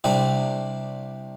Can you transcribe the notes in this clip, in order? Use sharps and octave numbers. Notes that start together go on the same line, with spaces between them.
C2 C3 G3 D4